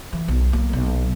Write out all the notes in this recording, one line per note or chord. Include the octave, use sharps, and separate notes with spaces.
E3
B1
A#3
B1